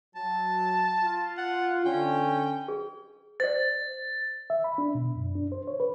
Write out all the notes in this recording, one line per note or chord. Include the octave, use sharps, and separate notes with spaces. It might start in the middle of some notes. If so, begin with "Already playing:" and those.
F#3 A5
F4
F#5
D3 C#4 G5
G#4
C5 D5 A6
E5
B5
D4
B2
F#2
D4
C5
C#5
B4